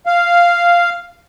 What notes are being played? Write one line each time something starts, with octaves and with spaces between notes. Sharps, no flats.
F5